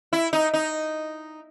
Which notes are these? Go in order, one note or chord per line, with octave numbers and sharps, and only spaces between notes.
E4
D#4
D#4